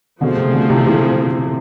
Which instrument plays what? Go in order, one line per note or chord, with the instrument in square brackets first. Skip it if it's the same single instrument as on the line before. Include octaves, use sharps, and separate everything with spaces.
[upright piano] B2 D3 [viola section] F3 A3 C4 G#4
[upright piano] C3
B2 D3
C3 E3
C3 E3